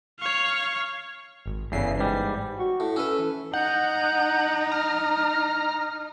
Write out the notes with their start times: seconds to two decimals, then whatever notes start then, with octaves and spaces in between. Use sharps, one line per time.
0.19 C#5 F5
1.46 G#1
1.72 G1 E2 C#3 E3 C7
1.98 G#2 G3
2.59 F#4
2.80 A2
2.96 C#4 A4 B4
3.19 E3
3.54 D#4 F#5 G6
4.72 A#5 F6